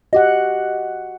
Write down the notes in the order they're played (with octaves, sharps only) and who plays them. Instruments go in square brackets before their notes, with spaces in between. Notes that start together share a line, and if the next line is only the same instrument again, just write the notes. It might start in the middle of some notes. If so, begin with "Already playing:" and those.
[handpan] F#4 F#5 [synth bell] G4 D#5